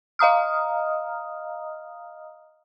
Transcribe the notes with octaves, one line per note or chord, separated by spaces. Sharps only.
D#5 F5 A#5 D#6 F6